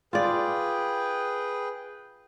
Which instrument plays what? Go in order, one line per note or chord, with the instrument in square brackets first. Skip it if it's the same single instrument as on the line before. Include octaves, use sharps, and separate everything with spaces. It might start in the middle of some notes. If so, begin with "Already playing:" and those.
[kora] F4 D5 [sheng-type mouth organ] G#4 B4 G5